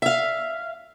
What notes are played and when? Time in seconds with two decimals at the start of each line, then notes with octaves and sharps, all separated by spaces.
0.02 E5 F5